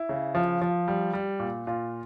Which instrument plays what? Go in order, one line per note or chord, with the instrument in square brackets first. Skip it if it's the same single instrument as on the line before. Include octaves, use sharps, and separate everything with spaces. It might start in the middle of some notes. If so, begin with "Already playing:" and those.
Already playing: [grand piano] E4
C#3
F3
F3
G3
G3
A#2
A#2 F4